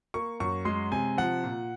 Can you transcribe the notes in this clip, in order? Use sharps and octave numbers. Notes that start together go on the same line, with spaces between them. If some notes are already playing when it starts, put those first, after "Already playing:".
A#3 C#6
F#2 C#6
G#3 C6
C3 G#5
F3 F#5
A#2